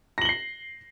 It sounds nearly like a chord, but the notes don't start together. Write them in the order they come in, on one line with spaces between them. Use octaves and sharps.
A#6 F#7 G7 C7